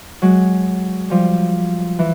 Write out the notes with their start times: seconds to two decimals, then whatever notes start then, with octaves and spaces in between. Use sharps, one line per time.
0.22 F#3 G#3
1.10 F3 G3
1.99 E3